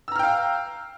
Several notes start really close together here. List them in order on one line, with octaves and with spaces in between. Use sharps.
E6 A#5 F6 G5 F5